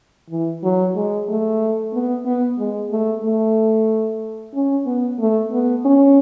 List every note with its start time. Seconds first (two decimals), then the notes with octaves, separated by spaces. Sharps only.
0.30 E3
0.63 F#3
0.95 G#3
1.29 A3
1.93 B3
2.25 B3
2.59 G#3
2.91 A3
3.24 A3
4.55 C#4
4.86 B3
5.19 A3
5.52 B3
5.85 C#4